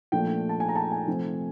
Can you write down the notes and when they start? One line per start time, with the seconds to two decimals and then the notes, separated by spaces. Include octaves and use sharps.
0.12 A#2 F3 A3 D4 G5
0.49 A5
0.60 G#5
0.69 A#5
0.76 A5
0.92 G#5
1.07 C3 F3 A3 C4